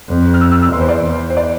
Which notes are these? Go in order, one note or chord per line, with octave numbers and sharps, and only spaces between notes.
F2
F6
E6
E6
E6
E2 C6
C5
D5
E2
C5
D5